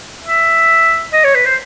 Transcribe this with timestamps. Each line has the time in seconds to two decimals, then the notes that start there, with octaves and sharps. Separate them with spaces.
0.25 E5
1.13 D#5
1.24 C#5
1.35 B4
1.46 C5